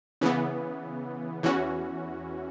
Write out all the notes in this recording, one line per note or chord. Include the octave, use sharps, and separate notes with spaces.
C#3 E3 B3
E2 E3 C#4 F#4